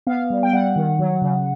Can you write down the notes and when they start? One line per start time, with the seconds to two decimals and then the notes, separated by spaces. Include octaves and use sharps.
0.07 B3 F5
0.30 G3
0.43 G5
0.53 G3 F#5
0.76 D#3
0.99 F#3
1.22 C#3